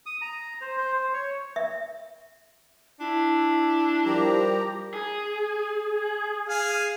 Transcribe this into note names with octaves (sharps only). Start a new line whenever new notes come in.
D#6
A#5
C5
C5
C5
C#5
E5
D4 E4
F3 G3 G4 A#4 A#5
G#4
G#4 F5 G#5